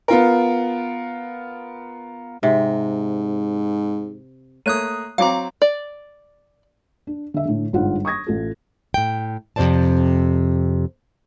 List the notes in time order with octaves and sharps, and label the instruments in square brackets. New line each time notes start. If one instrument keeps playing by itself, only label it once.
[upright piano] B3 F4 A#4
[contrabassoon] G#2 [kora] C3
[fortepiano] A3 A#3 C#5 [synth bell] D#6 F#6 D#7
[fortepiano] F#3 C4 D6 [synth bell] F5 A#5
[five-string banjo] D5
[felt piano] D4
D3 E5
A2 D3
G1 G#2 F4 F#5
C#6 D#6 G#6 A#6
A1 F4 A4
[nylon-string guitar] A2 G5
F2 C3 F#3 C5 D5 A5